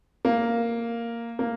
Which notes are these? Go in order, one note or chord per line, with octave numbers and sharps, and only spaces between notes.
A#3
A#3